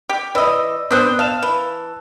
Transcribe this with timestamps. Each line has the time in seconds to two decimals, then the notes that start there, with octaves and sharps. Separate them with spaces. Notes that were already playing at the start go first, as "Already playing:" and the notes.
0.09 G4
0.35 E3 D5 D#5 E6
0.91 B3 C4 D4 C5 D#6 F#6
1.19 F5 A5 E7
1.42 E3